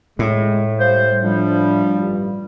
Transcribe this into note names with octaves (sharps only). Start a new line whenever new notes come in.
A2 G#3
G3 C5 F5
F3 G3 D4 F4
A1 G2